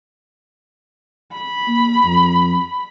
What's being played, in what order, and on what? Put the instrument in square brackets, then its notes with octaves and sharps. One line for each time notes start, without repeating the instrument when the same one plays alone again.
[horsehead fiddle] B5
[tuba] A#3
F2